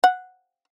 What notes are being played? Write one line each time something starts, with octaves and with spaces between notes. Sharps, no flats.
F#5